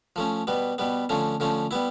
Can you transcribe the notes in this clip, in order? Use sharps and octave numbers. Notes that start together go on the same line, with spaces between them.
F3 A3 C#4
B2 G3 B3
B2 G3 B3
D3 F3 A3 C#4
D3 F3 A3 C#4
G3 B3 E4